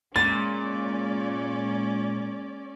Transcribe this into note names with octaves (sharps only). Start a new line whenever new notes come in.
A#2 G#3 A#3 C#4 D5 A6